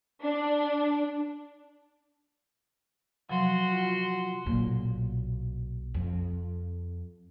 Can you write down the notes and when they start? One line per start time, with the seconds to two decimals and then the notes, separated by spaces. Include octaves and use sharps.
0.21 D4
3.30 C3 F3 F#3 F#4 C6
3.72 F4 F#5
4.46 B1 A#2
5.94 F2